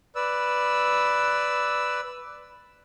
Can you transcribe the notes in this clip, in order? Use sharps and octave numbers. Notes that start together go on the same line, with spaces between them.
B4 D5 E6